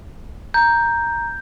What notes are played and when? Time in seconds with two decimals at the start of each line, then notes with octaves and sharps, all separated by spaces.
0.54 A#5 G6